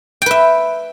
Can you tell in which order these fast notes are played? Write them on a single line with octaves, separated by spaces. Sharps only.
G5 B4 E5